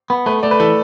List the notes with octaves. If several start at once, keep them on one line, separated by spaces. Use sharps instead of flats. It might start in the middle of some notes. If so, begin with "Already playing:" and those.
B3
A3 B4
A3 D5
B4
E3 A4